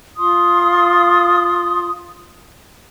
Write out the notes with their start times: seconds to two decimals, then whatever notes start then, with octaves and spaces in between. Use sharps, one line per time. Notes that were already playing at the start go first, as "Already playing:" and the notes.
0.17 F4 C6 D#6